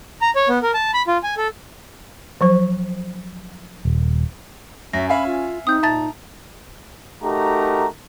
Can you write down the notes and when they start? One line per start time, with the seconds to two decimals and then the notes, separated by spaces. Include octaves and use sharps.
0.22 A#5
0.36 C#5
0.48 B3
0.62 A#4
0.74 A5
0.94 B5
1.07 F4
1.23 G#5
1.37 A4
2.41 F3 F#3 C5
3.85 D#1
4.93 F#2 C#4 E5 A#6
5.09 E5 F5 G#5 B5
5.26 F4
5.67 C4 D#4 D#6 G6
5.83 A#2 E5 A5 A#5 A6
7.23 A3 D#4 F#4 G4 A#4 A#5